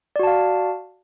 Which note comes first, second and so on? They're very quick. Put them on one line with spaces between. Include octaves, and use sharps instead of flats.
D5 F#4 A5 F5